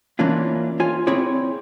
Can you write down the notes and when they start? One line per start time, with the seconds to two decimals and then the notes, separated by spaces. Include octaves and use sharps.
0.19 E3 A#3 C#4 D4 F4
0.80 F4 C#5 G#5
1.07 C4 E4 G#4 C#5 D5